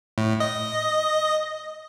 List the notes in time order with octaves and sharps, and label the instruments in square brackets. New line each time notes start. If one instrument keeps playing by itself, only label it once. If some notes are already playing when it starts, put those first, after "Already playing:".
[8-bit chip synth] A2
D#5